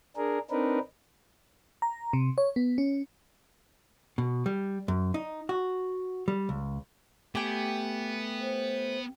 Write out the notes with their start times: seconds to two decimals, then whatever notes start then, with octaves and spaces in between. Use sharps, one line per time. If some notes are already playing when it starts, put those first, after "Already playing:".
0.17 D4 G#4 A#4
0.51 C4 D4 D#4 A#4 B4
1.82 A#5
2.13 C3
2.38 C#5
2.56 B3
2.78 C#4
4.18 B2
4.46 G3
4.88 F#2
5.14 D#4
5.49 F#4
6.28 G3
6.49 C#2
7.35 A3 B3 G4 G5 G#5
8.41 C5